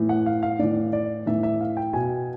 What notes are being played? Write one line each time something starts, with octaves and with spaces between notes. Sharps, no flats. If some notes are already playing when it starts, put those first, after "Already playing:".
Already playing: A2 E3
F#5
F5
F5
A2 E3 D5
D5
A2 E3 E5
E5
F5
G5
B2 G#5